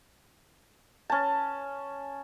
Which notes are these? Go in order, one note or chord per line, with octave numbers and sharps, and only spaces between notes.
C#4 A5